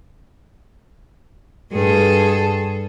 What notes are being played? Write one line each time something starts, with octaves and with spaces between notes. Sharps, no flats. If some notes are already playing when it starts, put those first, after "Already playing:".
G2 G#4 A4